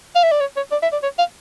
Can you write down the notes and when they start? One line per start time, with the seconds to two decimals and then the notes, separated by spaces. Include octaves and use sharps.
0.15 F5
0.23 E5
0.32 D5
0.40 C#5
0.56 C#5
0.71 D5
0.82 E5
0.92 D5
1.03 C#5
1.18 F5